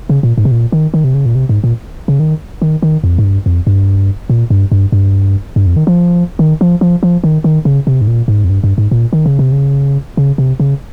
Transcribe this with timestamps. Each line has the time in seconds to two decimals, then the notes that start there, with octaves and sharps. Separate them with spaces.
0.09 C#3
0.23 A#2
0.38 G#2
0.45 C3
0.51 A#2
0.72 D#3
0.94 D#3
1.04 C3
1.14 C#3
1.26 A#2
1.35 C3
1.49 G#2
1.64 A#2
2.08 C#3
2.20 D#3
2.62 D#3
2.82 D#3
3.04 F2
3.18 G#2
3.24 G2
3.46 F2
3.67 G2
4.30 A#2
4.50 G2
4.72 G2
4.92 G2
5.56 G2
5.66 F2
5.76 D#3
5.87 F3
6.39 D#3
6.61 F3
6.81 F3
7.03 F3
7.24 D#3
7.44 D#3
7.65 C#3
7.87 C3
8.01 G#2
8.08 A#2
8.28 G#2
8.45 F2
8.50 G2
8.64 G2
8.78 G#2
8.91 A#2
9.13 D#3
9.26 C#3
9.39 C3
9.52 C#3
10.17 C#3
10.38 C3
10.60 C#3